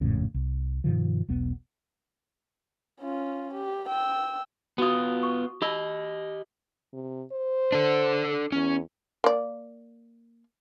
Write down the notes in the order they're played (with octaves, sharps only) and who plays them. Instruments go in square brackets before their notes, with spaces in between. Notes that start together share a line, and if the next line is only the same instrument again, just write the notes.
[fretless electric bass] G#1 F2 A2 C#3
C2
G2 B2 D#3 F3
E1 B1 B3
[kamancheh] C#4 F4
G4
G5 E6
[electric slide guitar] B3 F4 [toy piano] F#4 D#6
[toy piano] C#6
[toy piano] D#4 B5 E6 [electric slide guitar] G4 D#5
[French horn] C3
C5
[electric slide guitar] D4 A4
[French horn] E2 [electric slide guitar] C#4
[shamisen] A#3 D5